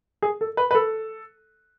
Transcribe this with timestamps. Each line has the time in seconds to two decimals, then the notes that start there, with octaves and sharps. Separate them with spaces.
0.22 G#4
0.41 A4
0.57 B4
0.71 B4
0.75 A4